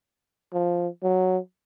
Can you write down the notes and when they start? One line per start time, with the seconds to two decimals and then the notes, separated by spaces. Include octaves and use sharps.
0.53 F3
1.03 F#3